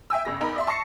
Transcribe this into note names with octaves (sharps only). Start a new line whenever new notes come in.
E5 G5 G#5 E6
G1 C#3 A#6
E2 D#4 A#4 B5
D5 E5 C6
A5 C#6 A#6 C7 C#7